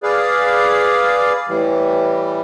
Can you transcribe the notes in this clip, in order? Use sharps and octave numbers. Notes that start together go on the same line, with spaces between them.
G#4 B4 D5 F5
A2 E3 G3